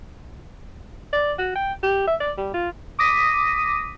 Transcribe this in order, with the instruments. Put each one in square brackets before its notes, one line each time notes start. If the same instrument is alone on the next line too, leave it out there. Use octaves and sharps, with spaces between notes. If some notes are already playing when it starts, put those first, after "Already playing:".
[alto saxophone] D5
F#4
G5
G4
E5
D5
G3
F4
[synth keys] D6 D#6 A#6 B6 D#7